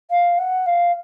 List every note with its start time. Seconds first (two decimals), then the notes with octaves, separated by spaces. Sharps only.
0.10 F5
0.38 F#5
0.66 F5